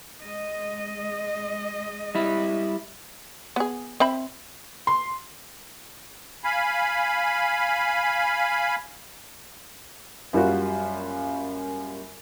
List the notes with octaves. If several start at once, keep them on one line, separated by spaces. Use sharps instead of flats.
G#3 D#5
G3 E4
B3 G#4
C4 E5 B5
C6
F5 G#5 B5
F#2 G3 A#3 F4 F#4